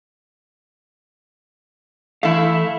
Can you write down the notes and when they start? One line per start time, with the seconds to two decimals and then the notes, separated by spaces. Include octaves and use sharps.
2.23 E3 A3 E4 F5